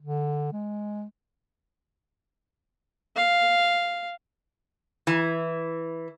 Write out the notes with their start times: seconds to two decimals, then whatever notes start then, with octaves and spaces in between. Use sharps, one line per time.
0.02 D3
0.53 G#3
3.16 F5
5.07 E3